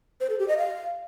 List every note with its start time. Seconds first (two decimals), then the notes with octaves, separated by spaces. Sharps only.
0.21 C5
0.30 A4
0.39 G4
0.48 D#5
0.57 F5